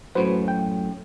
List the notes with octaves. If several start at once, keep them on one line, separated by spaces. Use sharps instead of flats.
F#2 A2 F#4 B4 C5
G5